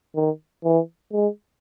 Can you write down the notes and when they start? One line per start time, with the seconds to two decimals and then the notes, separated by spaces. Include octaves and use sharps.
0.15 D#3
0.64 E3
1.12 G#3